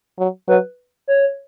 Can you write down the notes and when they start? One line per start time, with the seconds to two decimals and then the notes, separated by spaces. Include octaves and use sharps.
0.19 F#3
0.48 F#3 B4
1.08 C#5